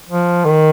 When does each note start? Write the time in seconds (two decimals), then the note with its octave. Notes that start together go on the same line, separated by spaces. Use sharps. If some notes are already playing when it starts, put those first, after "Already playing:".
0.10 F3
0.45 D#3